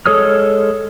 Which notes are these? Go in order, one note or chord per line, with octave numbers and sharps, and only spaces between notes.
G#3 A4 C#5 D#6 F6